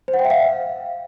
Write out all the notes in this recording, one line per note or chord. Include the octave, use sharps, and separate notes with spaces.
C5
F#5
G5
E5
F5